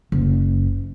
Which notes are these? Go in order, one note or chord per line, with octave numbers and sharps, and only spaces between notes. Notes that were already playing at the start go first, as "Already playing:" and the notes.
F#1